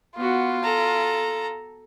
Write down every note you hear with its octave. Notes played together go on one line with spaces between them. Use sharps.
B3 F4 F#4
A4 A5 A#5